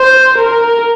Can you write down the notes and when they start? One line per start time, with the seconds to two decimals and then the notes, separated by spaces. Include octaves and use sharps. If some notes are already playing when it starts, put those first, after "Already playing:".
Already playing: C5
0.38 A#4